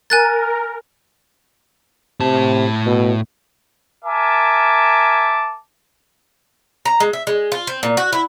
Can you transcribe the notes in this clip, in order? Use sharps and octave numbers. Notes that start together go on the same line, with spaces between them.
A#4 G#5 F#6 A6
A2 C3 A5
B2
A#4 E5 G#5 A5 D6
A#5
G#3
E5
G#3
F4
C4
A#2
F#4
E4